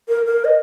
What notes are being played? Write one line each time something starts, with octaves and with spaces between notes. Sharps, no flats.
A#4
A#4
D#5